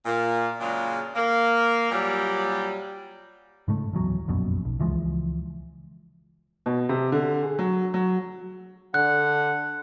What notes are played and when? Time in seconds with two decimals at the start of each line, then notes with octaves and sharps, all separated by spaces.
0.06 A#2
0.60 A#2 C#3 F#3 G#3 D4
1.16 A#3
1.91 A#2 F#3 G3
3.68 G#2 C#3 G#3 A3
3.92 D1 A1 E2 F#3
4.28 F1 A#1 F#2 B2
4.65 B1
4.80 C#2 E3 F3 G#3
6.66 B2
6.89 C3
7.12 D3
7.43 G#4
7.59 F#3
7.94 F#3
8.94 D3 F#5 F#6